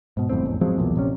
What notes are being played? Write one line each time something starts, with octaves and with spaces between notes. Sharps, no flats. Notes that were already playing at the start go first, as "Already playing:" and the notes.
G#2 B2
G1 F2 A2 C4
A1 E2
F3 F#3 G#3 C4
B1 E2 A#2
A#1 C3 C#4